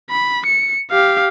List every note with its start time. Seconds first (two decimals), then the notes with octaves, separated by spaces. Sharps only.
0.10 B5
0.46 C#7
0.91 G4 F5